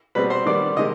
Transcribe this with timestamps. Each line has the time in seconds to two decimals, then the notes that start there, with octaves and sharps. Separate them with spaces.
0.15 B2 G3 C4 B4
0.30 C5
0.46 D#3 G3 B3 D5
0.77 C3 D#3 G#3 D#5